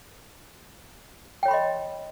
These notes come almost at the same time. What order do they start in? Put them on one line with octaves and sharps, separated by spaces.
G5 C#5 B5 C6 D#5